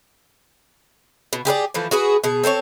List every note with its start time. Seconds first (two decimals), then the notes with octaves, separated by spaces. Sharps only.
1.33 B2
1.45 G4 G#4 A#4 D5
1.74 E3 F3 A3
1.91 F#4 G#4 B4
2.24 B2 G#4
2.44 C4 A4 C5 C#5